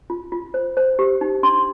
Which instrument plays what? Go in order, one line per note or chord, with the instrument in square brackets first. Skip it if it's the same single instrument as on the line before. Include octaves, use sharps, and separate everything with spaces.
[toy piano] F4
F4
C5
C5
G4
D#4
D4 C6